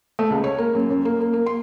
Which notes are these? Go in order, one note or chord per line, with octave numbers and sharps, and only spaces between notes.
A3
C#2
C#5
A#3
F#2
F#2
A#3
A#3
A#3
C6